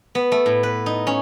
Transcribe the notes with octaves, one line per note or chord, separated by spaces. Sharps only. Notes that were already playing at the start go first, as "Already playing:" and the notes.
B3
A3
A2
B4
D#4
C#4